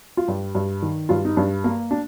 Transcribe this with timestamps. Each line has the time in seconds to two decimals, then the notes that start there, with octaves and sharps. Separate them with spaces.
0.17 F4
0.28 G2 G4
0.55 G2
0.82 D#3
1.09 G2 F4
1.25 D#4
1.37 G2 D4
1.64 A#3
1.91 D4